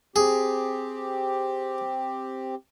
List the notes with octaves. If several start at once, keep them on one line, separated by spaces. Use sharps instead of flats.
C4 G4 G#4